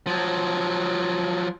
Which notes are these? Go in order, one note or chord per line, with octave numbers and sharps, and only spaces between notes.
F3 F#3